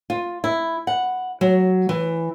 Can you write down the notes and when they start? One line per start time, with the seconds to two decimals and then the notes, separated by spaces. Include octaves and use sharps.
0.10 F4
0.44 E4
0.87 F#5
1.41 F#3
1.89 E3